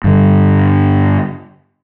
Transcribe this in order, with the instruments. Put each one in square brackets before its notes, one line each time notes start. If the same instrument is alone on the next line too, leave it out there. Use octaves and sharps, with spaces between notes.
[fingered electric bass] G2 D3